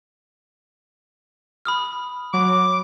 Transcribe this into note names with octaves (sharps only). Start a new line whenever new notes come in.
B5 D#6 F6
F#3 D6